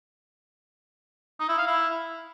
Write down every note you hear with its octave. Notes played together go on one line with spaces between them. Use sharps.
D#4
E4
F5
E4